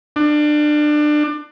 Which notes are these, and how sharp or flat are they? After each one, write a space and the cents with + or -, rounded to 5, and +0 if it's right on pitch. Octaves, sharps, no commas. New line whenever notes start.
D4 +25